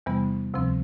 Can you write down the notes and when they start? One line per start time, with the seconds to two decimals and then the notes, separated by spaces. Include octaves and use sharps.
0.06 E2 C3 E3 G3 B3
0.54 D2 C3 F3 C4